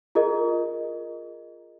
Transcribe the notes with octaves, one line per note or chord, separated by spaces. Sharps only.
F4 G#4 A#4 D#5